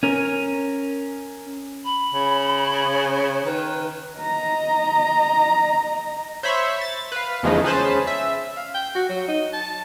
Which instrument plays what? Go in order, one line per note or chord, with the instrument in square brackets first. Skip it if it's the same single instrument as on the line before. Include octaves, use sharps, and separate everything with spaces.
[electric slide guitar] C#4 A#4
[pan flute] B5
[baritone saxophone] C#3
[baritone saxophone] D#3 [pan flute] B4
[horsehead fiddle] D#5 A#5
[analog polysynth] C5 C#5 E5 B5 C#6
A6
B4 F5
E2 C#3 F3 G#3 A3 D#4
C#4 G#4 B4 C5 A5 B5
E5
[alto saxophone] F5
G5
F#4
F#3
D#4
A5